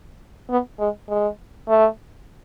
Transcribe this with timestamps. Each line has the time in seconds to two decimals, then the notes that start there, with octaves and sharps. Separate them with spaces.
0.50 B3
0.80 G#3
1.10 G#3
1.68 A3